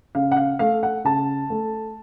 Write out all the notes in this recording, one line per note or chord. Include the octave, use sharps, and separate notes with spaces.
C#3 F5
F#5
F5
A3 F5
F#5
C#3 A5
A3